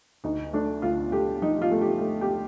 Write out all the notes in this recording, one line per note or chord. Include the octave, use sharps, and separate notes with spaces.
D2 D#4
A3 D4
D2 F4
A3 G4
F3 D#4
F4
A3
G4
A3
G4